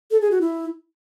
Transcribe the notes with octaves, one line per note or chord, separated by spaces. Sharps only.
A4
G#4
F#4
E4